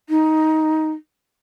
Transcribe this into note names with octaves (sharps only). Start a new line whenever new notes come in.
D#4